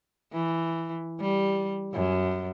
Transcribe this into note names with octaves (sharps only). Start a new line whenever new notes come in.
E3
G3
F#2